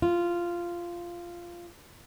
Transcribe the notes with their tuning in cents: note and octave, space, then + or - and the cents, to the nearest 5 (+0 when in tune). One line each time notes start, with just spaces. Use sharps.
F4 -10